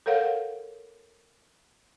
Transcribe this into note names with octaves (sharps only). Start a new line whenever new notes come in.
A4 A#4 C#5 F5 F#5